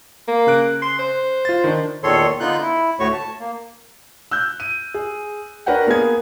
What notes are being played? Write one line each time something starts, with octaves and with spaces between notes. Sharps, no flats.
A#3
C#3 F#6 D7
C6
C5
F4 A6
D#3 D4
E2 A#2 D#3 A4 C#5 C6
D3 B3 D#4 F4 F#6 G6
E4
D2 A2 A3 F#4 C#5 C#6
A5
A#3
E6 F#6 G6
D#7
G#4
D4 A#4 B4 C#5 F#5 G5
A#3 B3 G#4 G#6